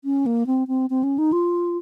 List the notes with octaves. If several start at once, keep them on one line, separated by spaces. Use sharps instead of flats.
C#4
A#3
C4
C4
C4
C#4
D#4
F4